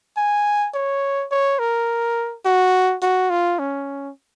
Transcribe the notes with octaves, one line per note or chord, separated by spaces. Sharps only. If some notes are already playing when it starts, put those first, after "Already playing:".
G#5
C#5
C#5
A#4
F#4
F#4
F4
C#4